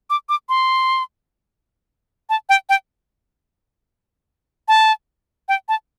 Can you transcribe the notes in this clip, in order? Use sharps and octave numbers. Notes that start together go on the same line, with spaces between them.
D6
D6
C6
A5
G5
G5
A5
G5
A5